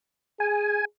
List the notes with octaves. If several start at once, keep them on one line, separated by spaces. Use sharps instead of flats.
G#4 G#5